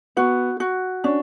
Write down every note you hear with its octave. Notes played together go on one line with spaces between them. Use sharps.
B3 F#4
F#4
C#4 D4